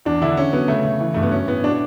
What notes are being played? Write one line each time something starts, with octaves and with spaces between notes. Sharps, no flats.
E2 D4
D3 E4
D3 C#4
F#3 B3
C#3 A3
C#3
E3
G2 A3
B3
F#3 C#4
A2 B3
B2 D4